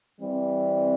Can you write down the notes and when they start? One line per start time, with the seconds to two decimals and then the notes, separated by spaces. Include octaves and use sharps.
0.21 E3 G3 C4